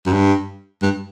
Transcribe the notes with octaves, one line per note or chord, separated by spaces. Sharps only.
F#2
G2
G2